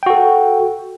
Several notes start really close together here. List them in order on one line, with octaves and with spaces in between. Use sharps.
G5 F#4 A4